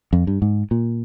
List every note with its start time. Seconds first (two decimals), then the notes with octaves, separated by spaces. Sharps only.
0.13 F2
0.27 G2
0.42 G#2
0.71 A#2